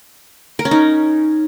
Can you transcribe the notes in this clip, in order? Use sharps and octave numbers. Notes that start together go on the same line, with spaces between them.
A#4
C#4
D#4